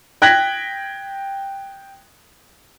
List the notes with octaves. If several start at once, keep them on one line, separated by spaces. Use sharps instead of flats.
G5 F#6 G#6 A#6 B6 F#7